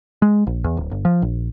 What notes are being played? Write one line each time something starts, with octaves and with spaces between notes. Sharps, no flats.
G#3
A#1
E2
D1
G1
F3
A#1